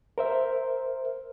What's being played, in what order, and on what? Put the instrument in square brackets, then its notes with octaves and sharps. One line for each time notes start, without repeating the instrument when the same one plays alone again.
[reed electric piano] A#4 C5 E5